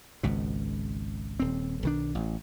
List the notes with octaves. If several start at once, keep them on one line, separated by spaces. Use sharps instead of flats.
G#1 C#2 B2
D#1 C4
B1 D#3 D4
A1